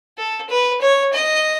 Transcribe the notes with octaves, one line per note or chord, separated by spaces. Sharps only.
A4
B4
C#5
D#5